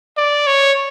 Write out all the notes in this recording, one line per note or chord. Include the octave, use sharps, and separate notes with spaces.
D5
C#5